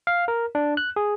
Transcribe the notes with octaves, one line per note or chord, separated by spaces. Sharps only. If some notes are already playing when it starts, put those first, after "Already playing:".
F5
A#4
D4
F#6
G#4